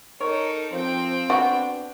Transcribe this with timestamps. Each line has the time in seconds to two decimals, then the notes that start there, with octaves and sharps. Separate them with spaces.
0.21 D#4 A4 A#4 C#5
0.73 F3 C4 G5
1.30 B3 D4 F#4